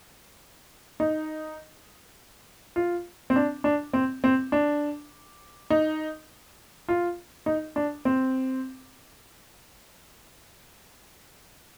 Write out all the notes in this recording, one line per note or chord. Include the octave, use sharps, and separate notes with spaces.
D#4
F4
C4
D4
D4
C4
C4
D4
D#4
F4
D#4
D4
C4